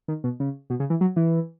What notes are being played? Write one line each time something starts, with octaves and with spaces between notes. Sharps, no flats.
D#3
B2
C#3
B2
C#3
E3
F#3
E3